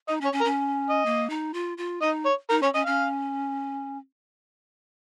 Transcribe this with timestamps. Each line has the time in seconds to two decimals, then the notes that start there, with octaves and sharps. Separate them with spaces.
0.08 D#4 D#5
0.21 C#4
0.25 C#5
0.33 C#4
0.40 A#4
0.45 C#4
0.90 D#5
1.05 A#3
1.30 D#4
1.54 F4
1.78 F4
2.02 D#4 D#5
2.25 C#5
2.50 D#4 A#4
2.62 C#4 C#5
2.74 C#4 D#5
2.86 C#4 F5